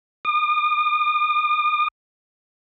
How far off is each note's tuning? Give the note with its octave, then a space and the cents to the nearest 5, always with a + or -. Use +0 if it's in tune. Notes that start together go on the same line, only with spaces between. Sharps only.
D#6 -45